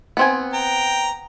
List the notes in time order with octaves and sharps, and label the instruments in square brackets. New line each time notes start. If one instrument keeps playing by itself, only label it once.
[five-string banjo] B3 C4 G#5
[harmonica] G5 A#5